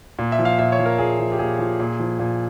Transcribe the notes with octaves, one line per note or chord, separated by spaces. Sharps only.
A#2
E5
F3
F5
A#2 E5
C#5
F3
A#4
A#2 G#4
F3
G4
A#2 G#4
F3
A#2
F3
A#2